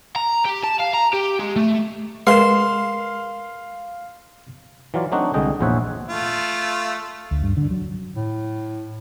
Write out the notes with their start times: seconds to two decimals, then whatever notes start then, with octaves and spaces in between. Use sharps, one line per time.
0.16 A#5
0.45 G4
0.64 A5
0.80 F5
0.94 A#5
1.14 G4
1.40 G#3
1.56 A3
2.27 G#3 A#4 B4 F5 C6 E7
4.94 E3 F#3 F4 D5
5.12 F#3 A3 C4 D4 D#4 F#4
5.34 C2 D3 G#3 D#5 G5
5.60 A#1 E2 C5 C#5 E5 F#5
6.08 A3 F4
7.31 D2
7.43 G2
7.57 D3
7.71 F#3
8.16 A2